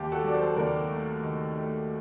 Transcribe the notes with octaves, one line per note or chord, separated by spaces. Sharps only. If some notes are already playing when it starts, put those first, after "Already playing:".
Already playing: D#2 G4
F#4 A4
F#3 D5
A4 C5
D#2 A#4 D5
A3
D#3
A3